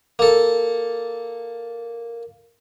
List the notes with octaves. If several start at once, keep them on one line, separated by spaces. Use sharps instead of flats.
A#3 A4